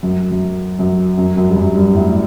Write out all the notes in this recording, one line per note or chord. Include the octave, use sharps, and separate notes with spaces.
F#2
F#2
F#2
F#2
F#2
G2
F#2
G2
A2